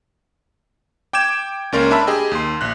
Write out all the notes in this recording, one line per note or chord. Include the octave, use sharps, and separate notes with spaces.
G5 D6 G6 G#6 E7
C#2 A#3 C#4 A#4 D5 C6
D4 E5 A5 B5 E6
G4 G#4 D#5 G5
D#2 C6
A#1 F#6